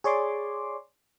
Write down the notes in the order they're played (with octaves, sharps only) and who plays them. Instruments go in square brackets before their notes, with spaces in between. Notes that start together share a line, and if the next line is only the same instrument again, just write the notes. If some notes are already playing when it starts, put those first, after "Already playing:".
[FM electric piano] G#4 C#5 D5 C6 D6